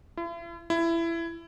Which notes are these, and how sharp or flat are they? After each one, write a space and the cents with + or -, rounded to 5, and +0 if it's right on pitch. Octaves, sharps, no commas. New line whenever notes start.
E4 +45
E4 +20